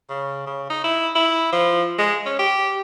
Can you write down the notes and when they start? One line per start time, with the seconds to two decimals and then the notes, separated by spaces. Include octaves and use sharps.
0.09 C#3
0.47 C#3
0.70 D#4
0.84 E4
1.15 E4
1.52 F3
1.99 G#3
2.26 C#4
2.39 G4